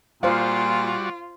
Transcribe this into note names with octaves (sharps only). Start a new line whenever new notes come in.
A#2 G3 F4 F#4 C5 D5 F5